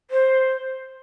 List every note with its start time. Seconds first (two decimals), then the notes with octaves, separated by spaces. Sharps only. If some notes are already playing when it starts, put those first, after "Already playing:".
0.11 C5